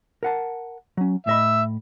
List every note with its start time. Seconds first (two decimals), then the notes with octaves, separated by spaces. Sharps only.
0.23 A#4 F#5 A5
0.97 F#3 C#4
1.27 A2 D#5 E5 B5